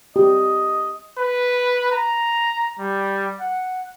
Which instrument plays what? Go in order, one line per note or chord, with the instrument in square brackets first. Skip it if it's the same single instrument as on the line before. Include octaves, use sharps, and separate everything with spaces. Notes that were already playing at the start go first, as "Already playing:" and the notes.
[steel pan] G4 [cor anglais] D#5
[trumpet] B4
A#5
G3
F#5